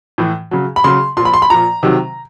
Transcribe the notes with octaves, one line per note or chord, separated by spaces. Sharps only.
A2 E3
C#3 F#3
B5
C#3 F#3 C6
A#2 F3 B5 C6
C6
B5
A#2 F3 A#5
C3 D#3 F#3